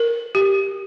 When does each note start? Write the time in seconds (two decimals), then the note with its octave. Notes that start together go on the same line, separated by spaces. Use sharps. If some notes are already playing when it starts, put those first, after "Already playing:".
Already playing: A#4
0.35 G4